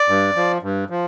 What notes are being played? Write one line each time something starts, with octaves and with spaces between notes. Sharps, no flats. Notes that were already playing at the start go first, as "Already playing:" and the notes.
Already playing: D5
G2
F3
G2
F3